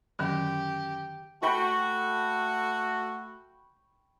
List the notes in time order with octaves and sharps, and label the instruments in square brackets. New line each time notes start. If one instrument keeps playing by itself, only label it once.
[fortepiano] F#2 [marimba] D3 D#3 [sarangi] G4
[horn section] A3 F#4 [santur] G5 B5 C#6